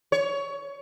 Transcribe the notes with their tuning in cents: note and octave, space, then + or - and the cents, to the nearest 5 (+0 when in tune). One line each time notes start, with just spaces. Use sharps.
C#5 +20